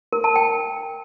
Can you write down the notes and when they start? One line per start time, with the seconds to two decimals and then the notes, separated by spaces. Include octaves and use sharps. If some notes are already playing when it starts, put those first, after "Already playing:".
0.13 A#4
0.24 A5
0.36 G5